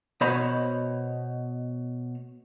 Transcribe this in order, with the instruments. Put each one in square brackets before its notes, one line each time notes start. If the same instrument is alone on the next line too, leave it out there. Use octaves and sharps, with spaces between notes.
[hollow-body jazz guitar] B2 C5 C#5 D#5 B5